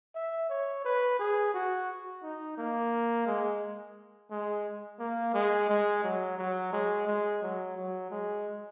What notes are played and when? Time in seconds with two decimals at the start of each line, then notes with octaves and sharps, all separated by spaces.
0.15 E5
0.49 C#5
0.84 B4
1.19 G#4
1.54 F#4
2.23 D#4
2.58 A#3
3.27 G#3
4.31 G#3
5.00 A#3
5.34 G#3
5.69 G#3
6.04 F#3
6.38 F#3
6.73 G#3
7.07 G#3
7.42 F#3
7.76 F#3
8.11 G#3